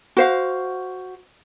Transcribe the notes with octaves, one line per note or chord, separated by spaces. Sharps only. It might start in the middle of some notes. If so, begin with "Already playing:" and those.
F#4 C5 F5